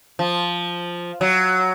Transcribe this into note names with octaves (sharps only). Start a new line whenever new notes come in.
F3
F#3